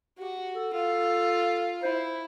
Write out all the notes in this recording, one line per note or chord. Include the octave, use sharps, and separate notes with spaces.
F#4 G4
A4
F4 A4
E4 C5